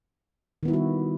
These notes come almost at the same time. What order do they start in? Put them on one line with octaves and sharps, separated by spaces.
D#3 B3 E4 G3 F#4